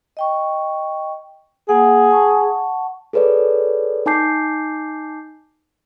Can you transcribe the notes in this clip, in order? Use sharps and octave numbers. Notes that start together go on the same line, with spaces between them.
D#5 G5 C#6
A#3 G#4 F#5
F#5 A5 C#6
G#4 A4 B4 C#5 D5
D#4 G#5 A5 D6 G6 C7